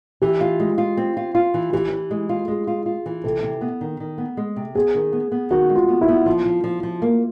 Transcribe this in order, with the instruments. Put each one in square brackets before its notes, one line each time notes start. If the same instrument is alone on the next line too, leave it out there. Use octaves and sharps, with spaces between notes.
[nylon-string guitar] E3 [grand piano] G4
[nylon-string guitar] F4
G#3
F4
C4
F4
F4
E3
[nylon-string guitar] E3 [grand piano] G4
[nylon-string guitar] E3
G#3
F4
[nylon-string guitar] G#3 [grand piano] G#4
[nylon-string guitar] F4
F4
E3
[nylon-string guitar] C3 [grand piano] A4
[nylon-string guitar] C3
B3
D#3
D#3
B3
G#3
C3
[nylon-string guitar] B3 [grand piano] G#4
[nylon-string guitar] D#3
B3
B3
[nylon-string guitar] D#3 [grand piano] F#4
[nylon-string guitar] G#3
[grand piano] F4
[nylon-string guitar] B3
[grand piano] E4
[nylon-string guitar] B3
[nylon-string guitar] F3 [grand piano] F4
[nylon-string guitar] F3
F3
F3
A#3